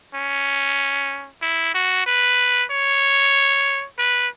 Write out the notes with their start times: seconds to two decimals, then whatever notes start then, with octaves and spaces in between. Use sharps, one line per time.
0.14 C#4
1.42 E4
1.74 F#4
2.06 B4
2.71 C#5
3.99 B4